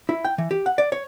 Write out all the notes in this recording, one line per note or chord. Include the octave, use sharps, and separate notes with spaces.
E4
G5
E3
G4
F#5
D5
C#5